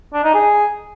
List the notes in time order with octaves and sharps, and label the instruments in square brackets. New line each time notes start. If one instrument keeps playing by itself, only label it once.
[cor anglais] D4
D#4
G#4